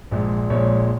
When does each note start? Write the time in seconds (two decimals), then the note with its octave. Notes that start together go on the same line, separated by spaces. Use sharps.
0.11 A#1 A#2 G#3
0.50 A#1 A#2 G#3 C#5